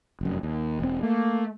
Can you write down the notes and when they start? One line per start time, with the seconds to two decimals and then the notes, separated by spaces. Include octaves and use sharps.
0.21 F1 F#2
0.43 D#2
0.80 E1 C4
1.03 A3 A#3